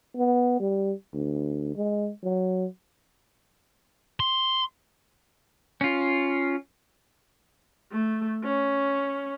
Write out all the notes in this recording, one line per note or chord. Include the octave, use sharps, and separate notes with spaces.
B3
G3
D2
G#3
F#3
C6
C#4 F4
A3
C#4